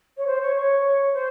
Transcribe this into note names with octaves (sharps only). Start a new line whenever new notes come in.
C#5
C5
C#5
C#5
C5